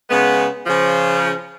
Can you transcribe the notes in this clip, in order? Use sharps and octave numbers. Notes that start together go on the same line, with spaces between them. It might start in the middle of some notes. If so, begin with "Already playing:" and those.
C#3 G#3 B3
C#3 F3